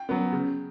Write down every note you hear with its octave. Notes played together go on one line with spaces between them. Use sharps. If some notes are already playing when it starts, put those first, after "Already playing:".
Already playing: G5
F#3 B3
C#3